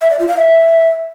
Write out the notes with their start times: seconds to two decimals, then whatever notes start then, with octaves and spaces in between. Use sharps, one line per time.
0.01 E5
0.10 D5
0.19 F4
0.28 F5
0.37 E5